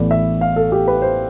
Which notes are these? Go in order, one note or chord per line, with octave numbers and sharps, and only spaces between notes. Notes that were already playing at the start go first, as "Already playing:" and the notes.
Already playing: A1 A2 E3 B3 D5
E5
F5
A4
G4
B4
C5